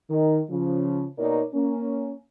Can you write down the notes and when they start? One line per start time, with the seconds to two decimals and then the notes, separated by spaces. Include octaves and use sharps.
0.10 D#3
0.50 C#3 F3
1.19 B2 A#3 D#4 A#4 C#5 D5
1.54 A#3 C#4